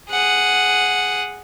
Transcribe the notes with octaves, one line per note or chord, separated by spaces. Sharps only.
G#4 F#5